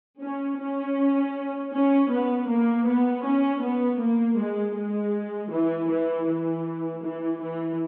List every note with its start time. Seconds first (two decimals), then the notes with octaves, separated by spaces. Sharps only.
0.20 C#4
0.58 C#4
1.73 C#4
2.10 B3
2.48 A#3
2.86 B3
3.24 C#4
3.62 B3
4.00 A#3
4.37 G#3
4.75 G#3
5.51 E3
5.89 E3
6.27 E3
7.03 E3
7.41 E3